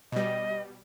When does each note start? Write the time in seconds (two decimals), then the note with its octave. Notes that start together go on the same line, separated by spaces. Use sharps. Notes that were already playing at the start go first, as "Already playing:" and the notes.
0.12 B2 G3 D#5